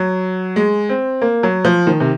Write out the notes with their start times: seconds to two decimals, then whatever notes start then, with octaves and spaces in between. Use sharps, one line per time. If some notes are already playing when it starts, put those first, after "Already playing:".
Already playing: F#3
0.56 G#3
0.89 C4
1.22 A#3
1.43 F#3
1.65 F3
1.87 D#3
2.00 C3